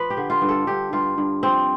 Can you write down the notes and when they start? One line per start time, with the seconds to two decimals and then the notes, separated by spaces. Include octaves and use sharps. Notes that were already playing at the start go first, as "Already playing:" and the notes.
Already playing: F3 B4
0.10 G4
0.17 D3
0.30 F4
0.42 G2
0.49 A4
0.67 G2 G4
0.93 G2 F4
1.18 G2
1.43 F3 C4